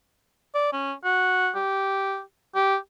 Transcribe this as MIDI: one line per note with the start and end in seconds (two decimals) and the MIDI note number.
0.55 0.72 74
0.72 0.93 61
1.04 1.50 66
1.55 2.21 67
2.55 2.76 67